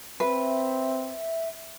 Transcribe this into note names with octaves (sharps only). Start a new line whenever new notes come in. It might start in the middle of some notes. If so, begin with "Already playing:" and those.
C4 B4 E5